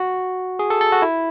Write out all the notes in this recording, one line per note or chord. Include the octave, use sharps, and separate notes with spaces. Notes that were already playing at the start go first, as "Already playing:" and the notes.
Already playing: F#4
G#4
A4
A4
F#4
E4